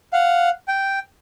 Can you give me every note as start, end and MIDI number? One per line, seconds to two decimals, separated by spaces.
0.13 0.50 77
0.13 0.50 78
0.68 0.99 79